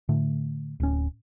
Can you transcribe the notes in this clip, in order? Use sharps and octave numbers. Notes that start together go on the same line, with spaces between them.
A2 D3 A3
D1 C#4